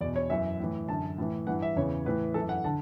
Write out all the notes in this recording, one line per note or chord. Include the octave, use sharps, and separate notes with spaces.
E2 B2 D5
C#5
F#2 E3 E5
A2 E3
F#2 D3 A5
A2 E3
G2 E3 F#5
E5
E2 C#3 E3 C#5
A2 E3 B4
F#2 E3 A4
F#5
D3 A5